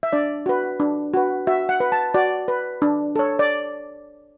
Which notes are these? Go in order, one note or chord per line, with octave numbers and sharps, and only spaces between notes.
E5
D4 D5
F#4 B4
D4
F#4 B4
F#4 E5
F#5
B4
A5
F#4 D5
B4
D4
A4 C#5
D5